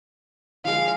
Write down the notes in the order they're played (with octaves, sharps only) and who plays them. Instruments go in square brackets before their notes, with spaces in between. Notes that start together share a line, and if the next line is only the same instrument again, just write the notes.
[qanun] F3 G#3 [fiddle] F5